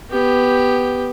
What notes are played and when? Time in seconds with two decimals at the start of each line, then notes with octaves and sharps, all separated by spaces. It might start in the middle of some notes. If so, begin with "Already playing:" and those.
0.11 B3 G4